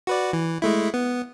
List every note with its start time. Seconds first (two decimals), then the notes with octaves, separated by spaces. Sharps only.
0.07 F#4 B4 D5
0.33 E3
0.62 G#3 A3 E4
0.94 B3